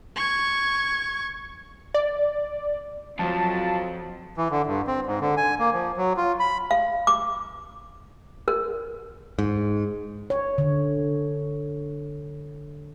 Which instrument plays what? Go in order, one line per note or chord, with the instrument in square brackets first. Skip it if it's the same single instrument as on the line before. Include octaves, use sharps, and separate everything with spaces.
[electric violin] C#6 G#6
[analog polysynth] D5
[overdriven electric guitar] F2 [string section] F3 F#3 [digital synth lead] A5
[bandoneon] E3
D3
G2
C4
G#2
D3
G#5
A#3
F3
F#3
F4
B5
[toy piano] F5
D6
A#4
[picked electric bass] G#2
[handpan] C#5
D3